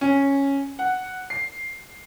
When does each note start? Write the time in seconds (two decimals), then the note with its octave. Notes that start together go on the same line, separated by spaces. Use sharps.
0.01 C#4
0.79 F#5
1.30 C7